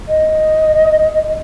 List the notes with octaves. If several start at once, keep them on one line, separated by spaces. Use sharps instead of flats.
D#5